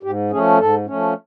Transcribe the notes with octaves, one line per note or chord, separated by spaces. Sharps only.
G#2 G4
F3 A3 C#4 G#4
G#2 A4
F3 A3 C#4